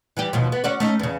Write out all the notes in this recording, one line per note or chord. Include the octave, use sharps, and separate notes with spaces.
E3 G3 G4
D#2 B2 F3
B3
C#4 F#4 D5
A3 C#4 D#4
E2 C#3